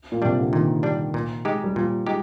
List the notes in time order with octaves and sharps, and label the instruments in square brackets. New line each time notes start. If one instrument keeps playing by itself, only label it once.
[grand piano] A#2
[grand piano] C3 [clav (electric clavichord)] G3 D4
[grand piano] D3
[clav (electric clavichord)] A#2 [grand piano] D#3
[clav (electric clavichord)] G3 D4
A#2
G#3 D#4 G4
[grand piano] G3
[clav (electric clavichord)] A#2 [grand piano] F3
[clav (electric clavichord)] G#3 D#4 G4